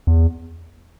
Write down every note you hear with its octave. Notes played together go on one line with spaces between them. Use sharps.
E2